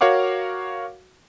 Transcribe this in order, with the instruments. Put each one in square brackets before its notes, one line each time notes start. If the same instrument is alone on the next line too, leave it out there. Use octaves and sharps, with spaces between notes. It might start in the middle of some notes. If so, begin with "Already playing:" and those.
[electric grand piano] F#4 A#4 C#5 F5 F#5 D6